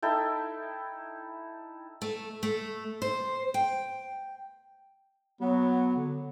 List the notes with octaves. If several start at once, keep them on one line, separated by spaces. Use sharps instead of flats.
D#4 E4 A4 G5
A3
A3
C5
G5
F#3 B3
D3